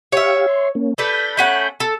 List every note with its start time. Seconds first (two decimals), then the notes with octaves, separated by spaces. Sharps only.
0.12 G4 C#5 E5 F5
0.48 C6
0.75 A#3 C#4
0.98 D4 A4 B4 B5 G6
1.37 A3 C#4 F#5
1.80 A4